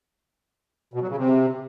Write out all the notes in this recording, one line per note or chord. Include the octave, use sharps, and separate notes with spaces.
B2
F#3
C#3
C3